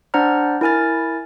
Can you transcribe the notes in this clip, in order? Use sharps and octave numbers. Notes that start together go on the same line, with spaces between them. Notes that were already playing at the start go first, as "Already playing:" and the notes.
D4 C5 D5 F#5 A#5 F6
E4 A#4 G#5 F6 A6